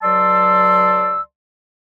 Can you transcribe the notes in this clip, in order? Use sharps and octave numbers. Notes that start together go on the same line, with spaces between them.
C#2 F#3 D5 A5 C6 E6